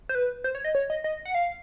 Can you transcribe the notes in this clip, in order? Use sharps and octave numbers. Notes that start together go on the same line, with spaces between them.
C5
B4
C5
C#5
D#5
C#5
D#5
D#5
F#5
F5